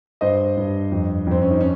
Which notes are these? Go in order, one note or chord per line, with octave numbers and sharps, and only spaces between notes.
G2 C5 D#5
G2
F2
F2 C4
C#4
D#4
C#4